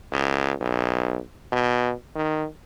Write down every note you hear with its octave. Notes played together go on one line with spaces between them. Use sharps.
C#2
B1
B2
D#3